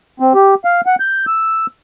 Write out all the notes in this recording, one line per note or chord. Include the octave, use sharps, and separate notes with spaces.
C4
G4
F5
F#5
G6
E6